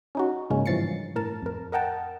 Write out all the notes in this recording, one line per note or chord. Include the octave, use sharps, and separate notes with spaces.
C#4 D#4 F#4
G#2 C#3 G#3 A#3 C#4
G2 E3 F3 A6 C7 C#7
A2 A#4 A5
F2 A#4
A#4 D#5 F#5 G5 A5